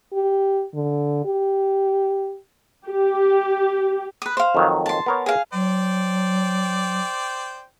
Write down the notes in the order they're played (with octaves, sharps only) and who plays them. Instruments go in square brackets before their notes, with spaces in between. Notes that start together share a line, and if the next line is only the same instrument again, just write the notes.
[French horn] G4
D3
G4
[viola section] G4
[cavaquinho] B4 D#6
C5 F5
[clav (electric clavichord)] F2 D#3 F#3
[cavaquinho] A5 C6
[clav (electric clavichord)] B3 A#4 C#5
[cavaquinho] G#4 F5
[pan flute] F#3 [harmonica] C5 D5 G5